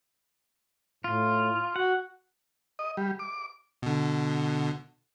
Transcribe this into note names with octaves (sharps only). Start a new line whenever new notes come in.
A2 F4
F#4 F#5
D#5
G3
D6
B2 D3